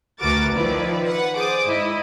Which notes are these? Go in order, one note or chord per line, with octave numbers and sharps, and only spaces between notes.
D2 F#4 A#4 B4 D6 A6
D#3 F3 E4 B4 D5
B4 F#5
G#4 C5 D5 D6 D#6
G#2 E4 D#5